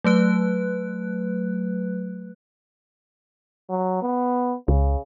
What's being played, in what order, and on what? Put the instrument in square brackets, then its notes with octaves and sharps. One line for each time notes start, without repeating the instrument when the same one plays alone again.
[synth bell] F#3 A3 B4 F#6
[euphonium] F#3
B3
[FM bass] C#2 [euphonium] C#3